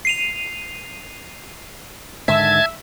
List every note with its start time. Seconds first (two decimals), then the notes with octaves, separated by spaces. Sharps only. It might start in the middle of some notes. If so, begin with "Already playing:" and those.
0.05 C7 D#7 F7
2.28 G#2 D3 D#3 E5 A5 G#6